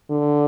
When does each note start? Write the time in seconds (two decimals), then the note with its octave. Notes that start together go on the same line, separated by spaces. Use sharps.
0.11 D3